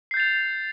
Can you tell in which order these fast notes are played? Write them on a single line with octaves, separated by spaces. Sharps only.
C7 G6 A6 F7